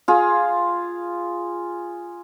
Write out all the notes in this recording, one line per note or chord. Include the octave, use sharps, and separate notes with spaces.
F4 G#4